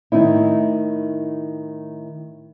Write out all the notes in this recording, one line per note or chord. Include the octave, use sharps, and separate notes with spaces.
A2 D#3 C4 D#4 E4